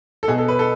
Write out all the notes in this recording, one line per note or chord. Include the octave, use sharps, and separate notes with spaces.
A4
B2 G#4
A4
B4
A4